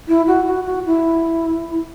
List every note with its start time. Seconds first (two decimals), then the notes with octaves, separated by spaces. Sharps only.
0.08 E4
0.27 F#4
0.47 F#4
0.66 F#4
0.86 E4